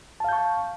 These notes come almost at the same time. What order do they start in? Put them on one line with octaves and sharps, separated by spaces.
A5 F5 G6 C#6